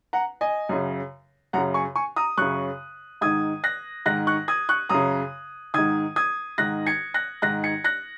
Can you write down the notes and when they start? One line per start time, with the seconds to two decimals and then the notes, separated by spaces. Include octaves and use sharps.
0.13 F#5 A#5
0.41 D#5 G#5
0.69 F#2 C#3
1.53 F#2 F#5 A#5
1.58 C#3
1.74 G#5 C#6
1.96 G#5 C#6
2.16 A#5 D#6
2.37 F#2 C#3 C#6 F#6
3.21 G#2 D#3 D#6 G#6
3.64 F#6 A#6
4.06 G#2 D#3 F#6 A#6
4.27 C#6 F#6
4.48 D#6 G#6
4.69 C#6 F#6
4.89 F#2 C#3 A#5 D#6
5.74 G#2 D#3 D#6 G#6
6.16 D#6 G#6
6.58 G#2 D#3 F#6 A#6
6.86 G#6 C#7
7.14 F#6 A#6
7.42 G#2 D#3 F#6 A#6
7.64 G#6 C#7
7.84 F#6 A#6